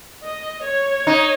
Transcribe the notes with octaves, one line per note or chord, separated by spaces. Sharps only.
D#5
C#5
D#4